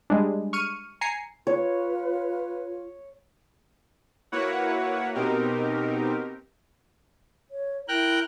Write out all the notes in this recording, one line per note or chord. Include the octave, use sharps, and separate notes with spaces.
G3 G#3 D4
C#6 F6 C#7 D#7
G#5 A#5 C7 C#7
F4 B4 C#5
A#3 E4 F#4 B4 C#5 F#5
B2 C4 D#4 G4 A#4
C#5
E4 A#4 G5 F#6